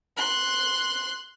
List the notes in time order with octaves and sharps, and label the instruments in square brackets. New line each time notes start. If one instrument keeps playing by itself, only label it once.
[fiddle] C6 F#6